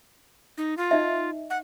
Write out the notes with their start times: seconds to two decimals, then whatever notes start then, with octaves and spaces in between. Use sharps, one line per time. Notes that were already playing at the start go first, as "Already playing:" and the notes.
0.58 D#4
0.78 F4
0.91 D#4 D#5 E5
1.50 F#5